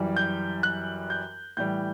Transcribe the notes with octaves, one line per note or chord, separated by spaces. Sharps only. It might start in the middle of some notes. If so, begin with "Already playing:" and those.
Already playing: F#2 E3 G3
G6
F#6
G6
A2 E3 G3 G6